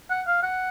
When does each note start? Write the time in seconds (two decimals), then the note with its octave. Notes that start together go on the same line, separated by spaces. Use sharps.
0.10 F#5
0.27 F5
0.43 F#5